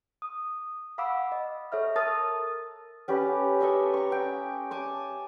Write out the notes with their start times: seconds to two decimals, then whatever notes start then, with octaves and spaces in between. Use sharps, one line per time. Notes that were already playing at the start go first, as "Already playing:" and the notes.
0.22 D#6
0.98 F5 F#5 B5 D6 E6
1.32 D#5
1.72 A4 C#5 E5 F6
1.96 A#4 A5 D#6 F6 A6
3.08 C#4 G4 A4 B4
3.60 A4 C#5 D#5 E5
3.94 A#5 C#6
4.12 G5
4.71 G#5 A5 D6